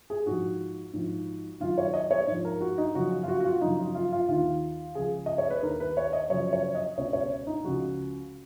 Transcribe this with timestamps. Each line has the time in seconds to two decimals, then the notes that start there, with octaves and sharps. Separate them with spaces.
0.10 G#4
0.26 G#2 F3 F#4
0.93 G#2 F3
1.60 F#2 D#3 F4
1.78 C#5
1.94 D#5
2.11 C#5
2.27 G#2 F3
2.45 A#4
2.61 F#4
2.78 D#4
2.94 F#2 C#3 F3 F#4
3.23 F4
3.28 F#4
3.40 F#4
3.44 F4
3.61 F#2 C#3 F3 D#4
3.79 F4
3.95 F4
4.12 F4
4.28 D#2 D#3 F4
4.95 C#2 C#3 F3 G#4
5.26 D#5
5.38 C#5
5.50 B4
5.63 D#2 D#3 A#4
5.80 B4
5.97 C#5
6.13 D#5
6.29 F#2 C#3 F3 C#5
6.53 C#5
6.75 D#5
6.98 C#2 B2 C#5
7.13 C#5
7.47 D#4
7.64 C#2 C#3 F3 F#4